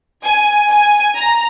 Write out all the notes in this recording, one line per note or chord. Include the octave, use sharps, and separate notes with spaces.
G#5
G#5
A#5